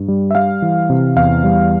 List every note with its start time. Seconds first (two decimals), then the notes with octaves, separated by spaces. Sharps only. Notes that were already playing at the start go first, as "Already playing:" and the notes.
Already playing: G2
0.08 G3
0.31 E5
0.35 G3 F5
0.62 E3
0.90 C3
1.16 E2 F5
1.44 G3